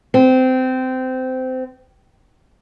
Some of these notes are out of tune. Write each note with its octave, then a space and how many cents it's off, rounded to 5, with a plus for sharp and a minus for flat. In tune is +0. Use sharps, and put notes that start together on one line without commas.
C4 -20